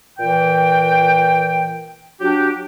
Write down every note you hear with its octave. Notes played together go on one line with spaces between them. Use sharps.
A#2 E3 G5
F#3 D4 G4